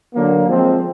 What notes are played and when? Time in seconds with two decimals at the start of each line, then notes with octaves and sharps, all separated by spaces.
0.14 D3 F#3 A#3
0.48 F3 G#3 C4